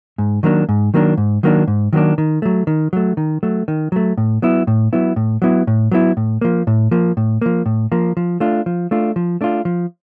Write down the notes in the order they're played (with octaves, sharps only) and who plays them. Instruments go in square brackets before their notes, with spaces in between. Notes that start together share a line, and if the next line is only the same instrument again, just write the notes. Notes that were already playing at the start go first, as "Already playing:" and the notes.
[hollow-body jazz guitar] G#2
D#3 F#3 A#3 D4
G#2
D#3 F#3 A#3 D4
G#2
D#3 F#3 A#3 D4
G#2
D#3 F#3 A#3 D4
D#3
F#3 A3
D#3
F#3 A3
D#3
F#3 A3
D#3
F#3 A3
A2
F#3 B3 E4
A2
F#3 B3 E4
A2
F#3 B3 E4
A2
F#3 B3 E4
A2
F3 A#3
A2
F3 A#3
A2
F3 A#3
A2
F3 A#3
F3
A3 D4 F4
F3
A3 D4 F4
F3
A3 D4 F4
F3